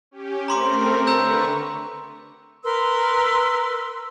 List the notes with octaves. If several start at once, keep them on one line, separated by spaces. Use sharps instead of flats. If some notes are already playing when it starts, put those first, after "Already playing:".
C#4 G4
A3 C4 A#4 A#5 C6 D6
D3 B4 A#5 C#6 E6 G6
A#4 B4 C6 E6